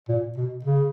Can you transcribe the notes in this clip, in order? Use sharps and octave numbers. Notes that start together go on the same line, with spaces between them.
A#2
B2
C#3